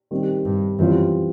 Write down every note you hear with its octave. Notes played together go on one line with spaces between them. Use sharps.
D#3 G3 C4
G2
F#2 E3 G3 C4 F4